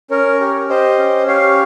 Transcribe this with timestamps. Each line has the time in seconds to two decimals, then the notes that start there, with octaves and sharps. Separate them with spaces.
0.11 C#4 A#4 C#5
0.41 G4
0.69 G4 C5 D#5
0.99 C#4
1.27 G4 C#5 F5